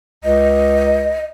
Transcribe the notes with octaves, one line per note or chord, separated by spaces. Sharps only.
C#2 D#5